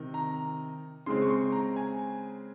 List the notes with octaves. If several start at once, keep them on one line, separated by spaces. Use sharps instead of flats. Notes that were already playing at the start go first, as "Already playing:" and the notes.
Already playing: C3 D#3
A#5
C#3 G#3 C4 C6
C#6
C6
A#5
G#5